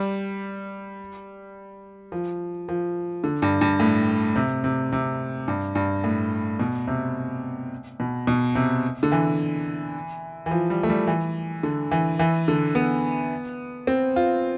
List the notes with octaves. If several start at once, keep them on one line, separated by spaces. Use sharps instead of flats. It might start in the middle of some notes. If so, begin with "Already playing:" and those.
Already playing: G3
F3
F3
D3
G2
G2
A2
C3
C3
C3
G2
G2
A2
B2
C3
B2
B2
C3
D3
E3
E3
F3
G3
A3
G3
E3
D3
E3
E3
D3
B3
C4
F4